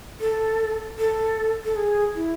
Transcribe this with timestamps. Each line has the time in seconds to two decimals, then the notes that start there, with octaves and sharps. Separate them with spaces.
0.21 A4
0.98 A4
1.65 A4
1.76 G#4
2.15 E4